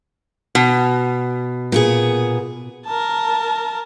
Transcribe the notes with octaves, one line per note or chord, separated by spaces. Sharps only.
B2
A#2 B3 G#4
A#4 A5